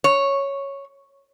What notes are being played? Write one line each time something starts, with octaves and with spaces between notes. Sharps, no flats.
C#5